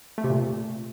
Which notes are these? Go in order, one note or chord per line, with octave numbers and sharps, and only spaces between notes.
A3
C3
A#2